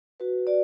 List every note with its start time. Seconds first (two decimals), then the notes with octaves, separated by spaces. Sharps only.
0.20 F#4 B4
0.47 F#4 D5